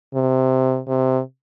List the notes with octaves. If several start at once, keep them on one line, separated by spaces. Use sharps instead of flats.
C3
C3